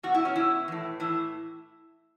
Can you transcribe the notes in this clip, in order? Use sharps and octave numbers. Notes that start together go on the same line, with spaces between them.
B2 F#4
E4
C#4
B2 E4
A2 E3
A2 E3 E4